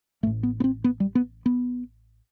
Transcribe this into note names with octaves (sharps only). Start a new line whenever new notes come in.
A1 A2 A3
B3
B3
C4
B3
G3
B3
B3